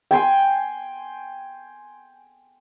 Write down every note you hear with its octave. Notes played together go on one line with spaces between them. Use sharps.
G5 G#5 C6